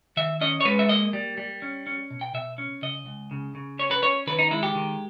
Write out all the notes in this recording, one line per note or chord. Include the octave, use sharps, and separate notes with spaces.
D#3 E5
C#4 D#5
C#5
G#3 B4
E5
A#3 D#5
G3
G3
C#4
C#4
B2
G5
B2 E5
C#4
C#3 D#5
C#2
C#3
C#3
C#4 C#5
B4
C#4 C#5
D#3 B4
D#4
G#3 E4
G4
D#3